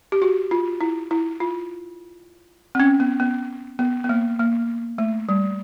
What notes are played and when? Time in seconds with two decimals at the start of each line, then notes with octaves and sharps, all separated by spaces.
0.12 G4
0.22 F#4
0.51 F4
0.81 E4
1.11 E4
1.40 F4
2.75 C4
2.80 C#4
3.00 B3
3.20 B3
3.79 B3
4.04 B3
4.09 A#3
4.39 A#3
4.98 A3
5.29 G3